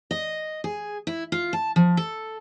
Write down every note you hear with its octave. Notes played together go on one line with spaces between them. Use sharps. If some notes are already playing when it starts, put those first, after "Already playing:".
D#5
G#4
E4
F4
A5
F3
A4